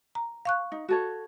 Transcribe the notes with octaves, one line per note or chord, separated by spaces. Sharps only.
A#5
F5 C#6 F#6
D#4
F#4 A4 C#5